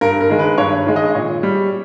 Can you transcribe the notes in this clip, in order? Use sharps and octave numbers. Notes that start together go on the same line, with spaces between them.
G2 A#4
A#4
D#3 G#3
B4
G2 C#5
D#3 G#3
D#5
A#2 C#5
G3